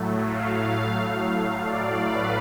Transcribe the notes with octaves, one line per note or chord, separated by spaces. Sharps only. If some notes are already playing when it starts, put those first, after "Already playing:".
Already playing: A2 F#3 A3
F5
D5
B4